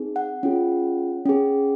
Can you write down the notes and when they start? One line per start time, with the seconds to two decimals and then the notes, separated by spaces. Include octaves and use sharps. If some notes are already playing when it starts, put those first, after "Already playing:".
Already playing: C4 D#4 G#4
0.16 F#5
0.43 C#4 F4 G#4
1.26 C#4 G#4